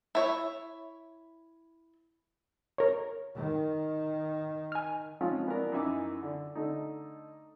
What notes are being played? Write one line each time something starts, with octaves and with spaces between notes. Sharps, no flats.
E4 C#5 E5
A#4 C#5
D#3
G#5 F6
F3 G#3 C4 C#4 D#4 F4
E3 B3 D4 F#4 A#4
F#2 E3 D#4 E5 G#5 D6
D3
D3 A3 D#4